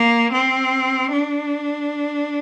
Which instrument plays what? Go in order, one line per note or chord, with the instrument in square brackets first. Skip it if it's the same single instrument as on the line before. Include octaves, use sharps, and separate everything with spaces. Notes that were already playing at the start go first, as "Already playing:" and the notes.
Already playing: [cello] A#3
C4
D4